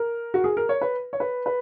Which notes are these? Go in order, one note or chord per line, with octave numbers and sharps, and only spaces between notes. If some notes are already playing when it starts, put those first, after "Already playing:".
Already playing: A#4
F#4
G#4
A#4
C#5
B4
C#5
B4
B4